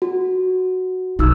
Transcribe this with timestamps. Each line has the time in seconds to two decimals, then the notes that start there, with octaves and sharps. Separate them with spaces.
0.02 F#4
1.19 B1 G3 D#4 E6